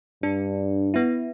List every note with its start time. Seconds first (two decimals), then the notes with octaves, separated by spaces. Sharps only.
0.23 G2 D4
0.94 B3 E4